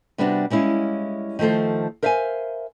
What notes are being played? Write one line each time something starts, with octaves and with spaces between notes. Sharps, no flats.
C3 G3 B3 D4 F4 F#4
G3 G#3 C#4 E4 F5
D#3 F3 A3 A4 C5
A#4 C5 E5 F5 G5 G#5